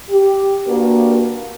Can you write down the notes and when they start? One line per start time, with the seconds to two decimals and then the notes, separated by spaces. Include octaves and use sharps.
0.11 G4
0.66 A#3 D4 F#4 G4 A#4 B4